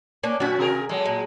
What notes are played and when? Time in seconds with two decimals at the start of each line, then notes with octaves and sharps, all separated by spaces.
0.23 A#3 C#4 D4
0.40 F#2 B2 C#4 F#4
0.59 C3 G#4 A#4
0.89 F#3 G#3 A4
1.06 A#2